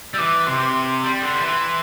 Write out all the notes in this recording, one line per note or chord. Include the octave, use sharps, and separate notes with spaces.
G3 E6
E3 D6
C3 C6
G3
D3
G3
E3